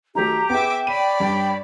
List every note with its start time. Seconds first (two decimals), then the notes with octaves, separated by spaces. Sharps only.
0.15 D#3 F#3 A3 G4 A#5
0.50 B3 G#4 E5 G5 D6
0.87 C#5 D5 B5 D#7
1.20 G2 G5